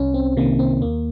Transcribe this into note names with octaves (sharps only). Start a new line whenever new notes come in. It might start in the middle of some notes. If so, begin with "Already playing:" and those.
Already playing: C2 C#4
C4
C3 D#3 A#3
C4
D#2 A#3